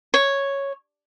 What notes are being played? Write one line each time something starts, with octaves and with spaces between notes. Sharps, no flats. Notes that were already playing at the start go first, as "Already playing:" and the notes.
C#5